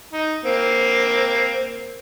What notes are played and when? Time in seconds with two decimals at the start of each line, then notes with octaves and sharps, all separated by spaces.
0.13 D#4
0.45 A#3 C4